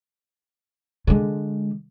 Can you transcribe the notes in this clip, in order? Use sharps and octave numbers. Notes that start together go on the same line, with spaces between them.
D3 G#3